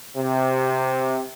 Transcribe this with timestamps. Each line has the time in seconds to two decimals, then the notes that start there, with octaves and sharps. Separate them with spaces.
0.17 C3